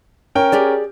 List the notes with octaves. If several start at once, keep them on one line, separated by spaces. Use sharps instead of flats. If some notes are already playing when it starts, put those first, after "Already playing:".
C#4 A#4 G5
G4 G#4 D5